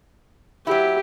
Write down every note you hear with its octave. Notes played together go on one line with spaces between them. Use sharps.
F#3 E4 G4